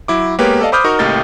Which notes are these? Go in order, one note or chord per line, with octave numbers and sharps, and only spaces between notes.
F#3 E4 D6
G#3 A#3 B3 G4 B4 C#5
A4 D5 D#5 F5 A5
C5 B5 D6 D#6 F6 G6
D#4 F#4 A#4 C#6
C#2 A2 A#3 G4 D#5 A6